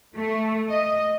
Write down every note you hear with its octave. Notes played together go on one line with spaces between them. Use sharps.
A3
D#5